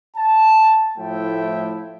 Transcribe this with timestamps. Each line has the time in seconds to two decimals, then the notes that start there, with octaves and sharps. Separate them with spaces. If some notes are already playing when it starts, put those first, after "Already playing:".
0.16 A5
0.98 A2 F3 A3 E4 E5 G5